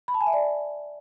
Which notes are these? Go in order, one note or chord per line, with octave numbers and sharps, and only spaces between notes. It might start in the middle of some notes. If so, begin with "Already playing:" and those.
B5
A5
G#5
E5
D5